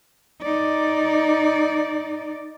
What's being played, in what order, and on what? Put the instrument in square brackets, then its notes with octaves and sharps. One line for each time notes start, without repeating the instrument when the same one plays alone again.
[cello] D#4 D5